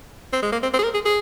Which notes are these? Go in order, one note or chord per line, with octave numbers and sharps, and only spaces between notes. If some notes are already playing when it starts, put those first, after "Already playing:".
C4
G#3
A#3
C4
C4
G#4
A#4
G#4
G#4